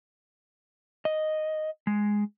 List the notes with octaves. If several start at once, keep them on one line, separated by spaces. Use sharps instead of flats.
D#5
G#3